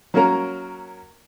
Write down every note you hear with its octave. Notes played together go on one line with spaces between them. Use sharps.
F#3 A#3 C#4 A#4